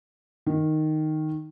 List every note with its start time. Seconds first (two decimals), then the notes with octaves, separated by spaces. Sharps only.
0.46 D#3